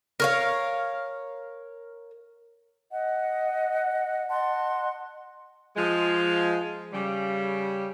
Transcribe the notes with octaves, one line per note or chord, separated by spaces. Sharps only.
A#4 C#5 F5
D#5 F#5
D#5 F#5 A5 C6
F3 G#3
C#3 G3